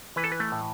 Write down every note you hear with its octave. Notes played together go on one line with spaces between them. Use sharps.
E3 B4
A4
B4
A3
A2